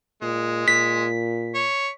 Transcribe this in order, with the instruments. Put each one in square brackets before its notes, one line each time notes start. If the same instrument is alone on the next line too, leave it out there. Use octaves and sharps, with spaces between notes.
[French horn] A#2 [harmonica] G#3
[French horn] A#2 [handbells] B6
[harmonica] C#5